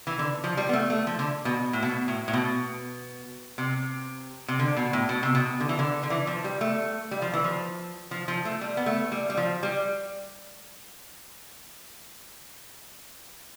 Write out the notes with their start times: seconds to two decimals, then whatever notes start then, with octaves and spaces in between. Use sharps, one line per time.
0.07 E3
0.19 D3
0.44 F3
0.57 G3
0.69 B3
0.73 A3
0.90 A3
1.07 F3
1.19 D3
1.45 B2
1.73 A2
1.83 B2
2.08 A2
2.28 A2
2.33 B2
3.58 C3
4.48 C3
4.59 D3
4.77 B2
4.93 A2
5.09 B2
5.23 C3
5.35 B2
5.60 D3
5.69 E3
5.79 D3
6.03 D3
6.10 E3
6.27 F3
6.44 G3
6.61 A3
7.11 G3
7.22 F3
7.33 E3
7.44 F3
8.11 F3
8.28 F3
8.45 A3
8.61 G3
8.77 B3
8.86 A3
9.12 G3
9.30 G3
9.37 F3
9.63 G3